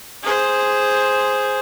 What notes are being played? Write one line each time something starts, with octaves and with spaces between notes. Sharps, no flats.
G#4 C5